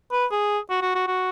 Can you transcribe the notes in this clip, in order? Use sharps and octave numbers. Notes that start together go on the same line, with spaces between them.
B4
G#4
F#4
F#4
F#4
F#4